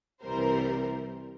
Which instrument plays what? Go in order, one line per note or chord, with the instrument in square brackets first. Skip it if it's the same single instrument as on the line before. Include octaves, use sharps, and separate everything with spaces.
[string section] C2 C3 E3 G3 A#4 C5